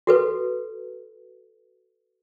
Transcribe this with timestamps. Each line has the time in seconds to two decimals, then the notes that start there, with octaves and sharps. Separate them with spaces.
0.07 F#4 A4 B4